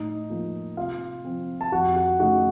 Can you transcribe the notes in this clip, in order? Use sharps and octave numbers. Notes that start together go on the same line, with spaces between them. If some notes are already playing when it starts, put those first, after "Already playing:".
Already playing: A2 D#4 D#5
F3 A#3
C3 F4 F5
F3 C4
A5
F2 F#4 F#5
F#4 F#5
C#3 A3 D#4 F#4 F#5